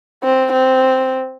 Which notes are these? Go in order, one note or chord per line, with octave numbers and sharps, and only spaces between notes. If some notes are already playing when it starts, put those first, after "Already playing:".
C4
C4